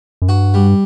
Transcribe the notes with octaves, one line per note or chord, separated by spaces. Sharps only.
F#2
G2 F#4
G3